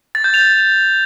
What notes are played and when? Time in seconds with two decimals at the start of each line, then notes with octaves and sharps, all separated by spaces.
0.15 A6
0.24 G6
0.34 F7